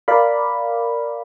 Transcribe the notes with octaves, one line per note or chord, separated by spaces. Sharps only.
A#4 D5 F5 B5